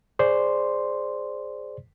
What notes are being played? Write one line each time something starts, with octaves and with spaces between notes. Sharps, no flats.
G#4 C5 D5 C6